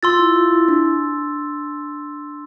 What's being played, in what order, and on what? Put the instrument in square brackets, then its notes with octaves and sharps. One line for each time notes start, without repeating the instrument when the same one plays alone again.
[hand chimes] F4 [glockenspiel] C6 E6 A6
[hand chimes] F4
E4
F4
E4
D4